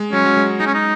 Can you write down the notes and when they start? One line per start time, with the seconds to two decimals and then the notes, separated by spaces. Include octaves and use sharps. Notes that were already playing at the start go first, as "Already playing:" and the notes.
Already playing: G#3
0.12 F#3 C#4
0.26 F#3
0.37 G#3
0.60 G#3 D#4
0.67 C#4
0.74 D#4